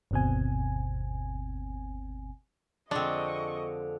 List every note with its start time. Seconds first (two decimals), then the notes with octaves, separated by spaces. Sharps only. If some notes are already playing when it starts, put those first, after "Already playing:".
0.11 G1 D#2 B2 C4 G#5
2.91 F2 D3 G#3 C4 D4 D#5 C#6